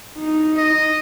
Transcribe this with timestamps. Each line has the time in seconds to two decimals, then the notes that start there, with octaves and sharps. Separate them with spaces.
0.19 D#4
0.57 D#5